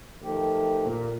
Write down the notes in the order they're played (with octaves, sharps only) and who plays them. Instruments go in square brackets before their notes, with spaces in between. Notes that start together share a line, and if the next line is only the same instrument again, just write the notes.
[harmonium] D#3 F3 G4 [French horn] A3
[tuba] A#2